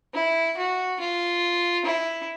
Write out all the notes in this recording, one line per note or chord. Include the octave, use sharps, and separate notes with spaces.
E4
F#4
F4
E4